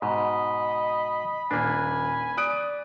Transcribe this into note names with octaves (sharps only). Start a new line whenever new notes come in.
G#2 B2 D#5 B5
D#1 A#3 D4 G#5
D5 D#6 F#6 D7